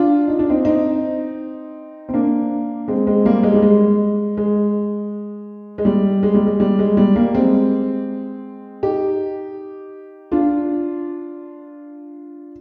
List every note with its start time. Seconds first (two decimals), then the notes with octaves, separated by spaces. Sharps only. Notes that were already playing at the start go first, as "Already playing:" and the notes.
Already playing: D4 F4
0.28 D#4
0.39 D4
0.50 C4 D#4
0.65 C4 D#4
2.09 C4
2.14 A#3 D4
2.88 G#3 C4
3.07 G#3 C4
3.25 G3 A#3
3.43 G#3
3.53 G3
3.63 G#3
4.37 G#3
5.78 G#3
5.85 G3
6.23 G#3
6.34 G3
6.47 G#3
6.60 G3
6.79 G#3
6.97 G3
7.16 G3 A#3
7.35 G#3 C4
8.83 D#4 G4
10.32 D4 F4